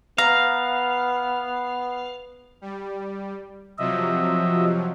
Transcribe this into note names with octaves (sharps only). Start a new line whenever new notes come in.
B3 F5 A#5
G3
C3 F3 F#3 D#5 E5